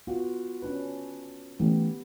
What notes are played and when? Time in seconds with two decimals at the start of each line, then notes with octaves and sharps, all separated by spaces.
0.07 B3 F4 F#4
0.62 C#4 D4 B4
1.60 E3 A3 B3 C#4 G4